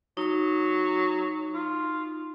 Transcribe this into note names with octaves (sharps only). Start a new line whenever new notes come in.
F#3 D#4 D#6
F4